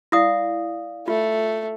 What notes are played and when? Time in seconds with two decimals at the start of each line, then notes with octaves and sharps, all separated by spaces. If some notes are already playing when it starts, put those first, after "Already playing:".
0.12 E4 D5 F5 D#6 A#6
1.08 A3 F4